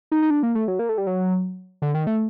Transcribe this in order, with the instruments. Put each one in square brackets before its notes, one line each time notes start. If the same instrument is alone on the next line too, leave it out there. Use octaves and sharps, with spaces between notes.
[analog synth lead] D#4
D#4
D4
A#3
A3
F#3
A#3
A3
G3
F#3
D3
D#3
A3